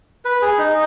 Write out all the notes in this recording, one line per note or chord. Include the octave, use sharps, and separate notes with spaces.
B4
G#4
D#4